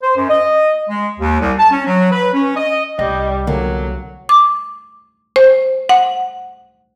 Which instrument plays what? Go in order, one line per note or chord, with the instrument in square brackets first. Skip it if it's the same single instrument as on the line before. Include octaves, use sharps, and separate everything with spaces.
[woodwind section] C5
F#2
D#5
G#3
D#2
C2
A5
C#4
F#3
B4
C#4
D#5
[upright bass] C2 [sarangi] G3 [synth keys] D#5
[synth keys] D3 [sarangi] F#3 [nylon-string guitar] A#3
[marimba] D6
C5
F#5